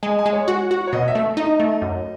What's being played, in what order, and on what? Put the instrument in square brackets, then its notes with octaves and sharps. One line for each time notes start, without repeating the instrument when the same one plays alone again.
[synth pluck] G#3 [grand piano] G#5
[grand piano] G#5
[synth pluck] G#3
[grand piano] C#5
[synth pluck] F#4
F#4
[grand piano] C#5
[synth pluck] B2 [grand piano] D#5
[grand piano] E5
[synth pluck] A3
[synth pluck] D#4 [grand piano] D#5
[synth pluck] A3
F#2